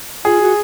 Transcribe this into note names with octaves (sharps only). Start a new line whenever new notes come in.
F4 G#4
F#4